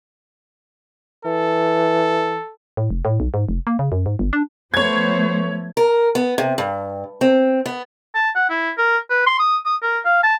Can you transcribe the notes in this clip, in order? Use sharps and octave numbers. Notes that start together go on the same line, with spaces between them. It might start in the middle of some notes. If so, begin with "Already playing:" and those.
E3 A4
A2
F1
A2
B1
G#2
F1
A#3
C#3
F#2
G#2
G1
D4
F3 A3 B3 C5 C#5 G#6
A#4
B3
C3
G2
C4
B3
A5
F#5
E4
A#4
B4
C6
D#6
D#6
A#4
F5
A5